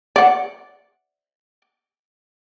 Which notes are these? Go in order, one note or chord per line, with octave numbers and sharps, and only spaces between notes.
D5 F#5